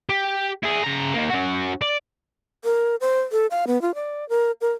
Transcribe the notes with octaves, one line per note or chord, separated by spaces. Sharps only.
G4
E4 G#4
C#3 A#5
A#3 D#4
C#4 F#4
D5
A#4
C5
A4
F5
B3
F4
D5
A#4
A#4